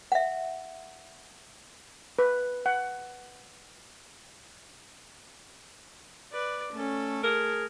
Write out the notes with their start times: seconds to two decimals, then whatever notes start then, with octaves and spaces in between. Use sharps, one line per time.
0.12 E5 F#5
2.19 B4
2.66 F#5
6.32 B4 D5
6.72 A3 C#4 A4
7.23 G#4 A#4